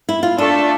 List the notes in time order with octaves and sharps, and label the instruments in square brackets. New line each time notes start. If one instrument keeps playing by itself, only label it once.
[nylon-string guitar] E4
F4
[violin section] A3 D4 A4 [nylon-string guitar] F4